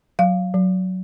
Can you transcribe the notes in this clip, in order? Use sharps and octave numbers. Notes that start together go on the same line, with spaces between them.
F#3 F5
F#3